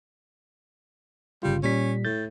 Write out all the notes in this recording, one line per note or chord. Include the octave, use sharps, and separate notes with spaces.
G1 C#3 G3 F4
A#2 G3 C#4 B6
A2 G6 A6